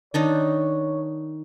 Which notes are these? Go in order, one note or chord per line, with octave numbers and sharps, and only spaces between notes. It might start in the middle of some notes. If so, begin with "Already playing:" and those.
D#3 D4 D#4 C#5